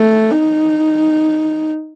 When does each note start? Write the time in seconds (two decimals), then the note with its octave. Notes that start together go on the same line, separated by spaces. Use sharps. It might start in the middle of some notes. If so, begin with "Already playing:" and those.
Already playing: A3
0.31 D#4